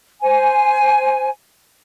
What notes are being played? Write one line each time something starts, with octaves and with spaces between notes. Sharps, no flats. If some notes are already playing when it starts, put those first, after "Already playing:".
C5 G#5